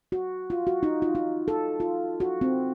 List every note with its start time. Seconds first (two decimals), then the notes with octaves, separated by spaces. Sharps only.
0.12 F#4
0.50 F4
0.67 F#4
0.83 D#4
1.02 F4
1.15 D#4
1.48 A4
1.80 F4
2.20 F#4
2.41 C4